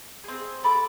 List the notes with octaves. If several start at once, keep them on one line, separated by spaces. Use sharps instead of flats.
C4 G#4
A4 B5 D6